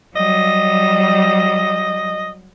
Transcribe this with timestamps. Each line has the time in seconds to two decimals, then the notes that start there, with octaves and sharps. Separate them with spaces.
0.16 F#3 G3 D#5